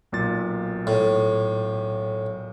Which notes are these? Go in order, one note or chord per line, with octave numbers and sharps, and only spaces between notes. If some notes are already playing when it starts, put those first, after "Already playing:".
B1 A#2 A6
A2